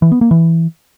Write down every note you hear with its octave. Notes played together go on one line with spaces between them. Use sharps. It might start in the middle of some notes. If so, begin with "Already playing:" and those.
E3
B3
A#3
E3